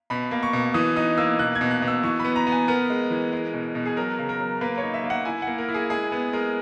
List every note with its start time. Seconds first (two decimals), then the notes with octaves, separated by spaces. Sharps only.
0.10 B2 B5
0.31 A#3
0.43 C#6
0.53 B2
0.74 E3 D#6
0.96 D#4 D#6
1.18 A#3 E6
1.39 B2 F#6
1.55 G#6
1.61 B2
1.71 F#6
1.82 B2
1.88 E6
2.03 E3 C#6
2.19 B3 B5
2.36 A#5
2.47 B3
2.52 G#5
2.68 B3 A#4
2.90 G#3
3.10 E3
3.33 G#3
3.54 B2
3.75 B2
3.86 G#4
3.97 F#3 A#4
4.19 C#3
4.29 A#4
4.40 F#3
4.61 A#3 B4
4.78 C#5
4.83 D#4
4.94 E5
5.04 A#3
5.10 F#5
5.25 E4 G#5
5.42 F#5
5.47 A#3
5.58 A#4
5.69 E4
5.74 G#4
5.90 G#3 G#4
6.12 B3
6.33 G#3 A#4